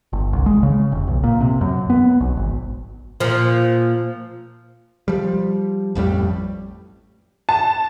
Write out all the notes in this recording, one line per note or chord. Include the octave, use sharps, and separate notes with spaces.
G1
C2
G#3
C#3
F1
B1
A#2
C3
F#2
B3
B1
G#1
A#2 F3
F3 G3
A1 F2 A2 G3
A5